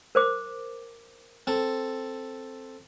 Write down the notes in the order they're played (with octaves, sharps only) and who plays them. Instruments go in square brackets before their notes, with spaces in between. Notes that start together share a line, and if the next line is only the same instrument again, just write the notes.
[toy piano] A#4 C5 D6
[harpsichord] C4 A4